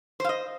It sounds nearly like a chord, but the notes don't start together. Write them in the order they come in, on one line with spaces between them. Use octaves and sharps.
C5 F5 D#5